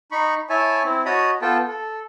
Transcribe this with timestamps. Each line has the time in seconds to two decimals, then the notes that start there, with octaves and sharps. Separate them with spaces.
0.12 D#4 B5 C#6
0.50 E4 C#5 E5 G#5 A5
0.84 C4 E4
1.05 F#4 C#5 D#5 A5 B5 D#6
1.42 B3 F4 A4 G5 A5
1.68 A4